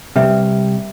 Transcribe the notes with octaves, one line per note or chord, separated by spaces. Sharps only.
C3 G3 B4 E5